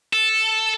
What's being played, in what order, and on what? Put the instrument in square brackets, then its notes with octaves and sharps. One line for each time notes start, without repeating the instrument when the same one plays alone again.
[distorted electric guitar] A4